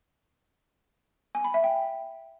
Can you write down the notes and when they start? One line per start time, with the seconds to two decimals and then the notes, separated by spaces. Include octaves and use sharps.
1.35 G#5
1.44 B5
1.54 E5
1.64 G5